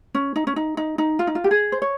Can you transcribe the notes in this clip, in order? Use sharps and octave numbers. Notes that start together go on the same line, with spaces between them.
C#4
D#4
C#4
D#4
D#4
D#4
F4
D#4
F4
G4
G#4
C5
C#5